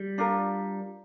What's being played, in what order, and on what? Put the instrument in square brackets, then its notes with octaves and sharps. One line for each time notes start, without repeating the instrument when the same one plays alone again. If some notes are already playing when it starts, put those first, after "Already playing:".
Already playing: [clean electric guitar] G3
[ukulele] D4 F4 A#4